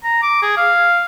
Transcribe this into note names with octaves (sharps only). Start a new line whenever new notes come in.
A#5
D6
G#4
F5